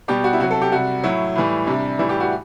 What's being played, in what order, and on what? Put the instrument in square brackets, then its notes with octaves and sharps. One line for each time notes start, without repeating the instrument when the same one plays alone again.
[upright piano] B2 G3 G4
F#4
E4
C3 F#4
F#3
A4
G4
C3 G3 F#4
A2 F#3 E4
A2 E3 G3
C3 G3 D4
A2 E3 G3 E4
G4
F#4